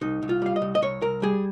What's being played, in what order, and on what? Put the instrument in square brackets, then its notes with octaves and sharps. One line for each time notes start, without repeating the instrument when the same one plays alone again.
[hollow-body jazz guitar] C2 D#4
C2
F4
G3 F5
D#5
C2
D#5
C2 C#5
C2 A#4
G3 G#4